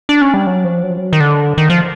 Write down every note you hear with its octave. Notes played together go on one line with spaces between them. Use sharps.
D4
C#4
G3
F#3
F3
F#3
F3
F#3
D#3
D3
D#3
F3